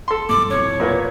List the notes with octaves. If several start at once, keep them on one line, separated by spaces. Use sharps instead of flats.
A4 C6
B1 G2 A#3 D6
C2 F2 B2 C#5
A#2 A#3 B3